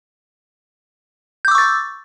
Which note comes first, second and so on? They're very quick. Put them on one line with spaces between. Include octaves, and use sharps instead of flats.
G6 D6 E6 C#6 A6